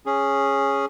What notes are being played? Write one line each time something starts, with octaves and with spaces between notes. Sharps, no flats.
C#4 G#4